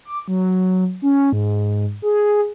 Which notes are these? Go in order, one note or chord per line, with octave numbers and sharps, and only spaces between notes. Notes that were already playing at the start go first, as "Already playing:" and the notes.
D6
F#3
C#4
G#2
G#4